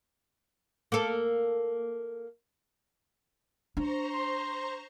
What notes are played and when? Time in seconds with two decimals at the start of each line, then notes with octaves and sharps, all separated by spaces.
0.92 A#3 A4
3.77 D4 C5 A#5 C#6
4.13 C6